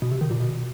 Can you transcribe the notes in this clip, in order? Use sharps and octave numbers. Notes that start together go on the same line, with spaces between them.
B2
C3
D#3
A#2
B2